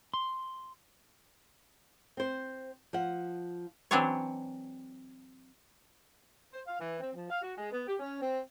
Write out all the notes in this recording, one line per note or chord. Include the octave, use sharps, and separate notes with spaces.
C6
C4 C5
F3 F#5
E3 F#3 C4 D4 E4 C#5
C5
F5
E3
C4
F3
F5
F#4
G#3
B3
G4
C#4
C4